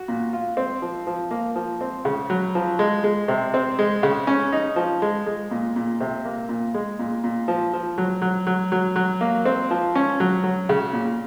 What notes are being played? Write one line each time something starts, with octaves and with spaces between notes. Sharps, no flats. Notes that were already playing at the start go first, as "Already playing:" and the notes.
Already playing: F#4
A#2
F4
C4
F3
F3
A#3
F3
C4
C#3
F#3
F3
G#3
G#3
C3
C4
G#3
C#3
C#4
D#4
F3
G#3
G#3
A#2
A#2
C3
A#3
A#2
G#3
A#2
A#2
F3
F3
F#3
F#3
F#3
F#3
F#3
A#3
C4
F3
C#4
F#3
F#3
C#3
A#2